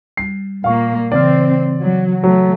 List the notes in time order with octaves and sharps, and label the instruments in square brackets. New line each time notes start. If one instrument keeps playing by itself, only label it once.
[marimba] G3 [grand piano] C7
[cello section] A#2 A#3 [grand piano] F5 C#6
[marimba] C#3 E3 F6 [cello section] C4 [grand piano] D5
[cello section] F#3
[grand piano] F#3 [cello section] A3